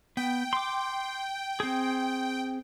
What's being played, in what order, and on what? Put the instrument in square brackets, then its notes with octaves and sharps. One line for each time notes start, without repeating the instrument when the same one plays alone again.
[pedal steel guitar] B3 [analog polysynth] G5
[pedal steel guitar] C6 D6
C4 G#4